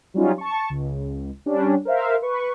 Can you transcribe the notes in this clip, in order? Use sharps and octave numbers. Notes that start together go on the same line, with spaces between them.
F#3 G3 C#4 D#4 F4
A5 C#6
C#2
G3 C#4 D4
A#4 C5 E5 F5
B4 C#6